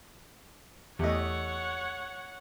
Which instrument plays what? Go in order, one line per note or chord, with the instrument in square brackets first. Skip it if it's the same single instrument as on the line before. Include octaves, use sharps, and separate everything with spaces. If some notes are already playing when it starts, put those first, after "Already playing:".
[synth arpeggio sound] E2 D#5 [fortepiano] A3 E4 G4 [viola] C#5 F#5